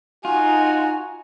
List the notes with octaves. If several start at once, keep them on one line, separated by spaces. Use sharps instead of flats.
D#4 F4 F#4 G#5